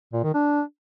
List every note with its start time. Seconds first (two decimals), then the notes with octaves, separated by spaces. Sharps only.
0.13 A#2
0.24 D#3
0.34 D4